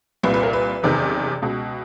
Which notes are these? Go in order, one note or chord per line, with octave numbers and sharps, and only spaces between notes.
C2 A#2 B4
B4
A#4
B4
F#1 E2 C3 D#3
C#2 B2